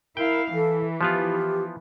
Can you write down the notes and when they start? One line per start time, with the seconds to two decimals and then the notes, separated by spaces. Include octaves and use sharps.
0.17 E4 A#4 F5 G5
0.54 E3 A4
1.01 F3 B3 F4 G4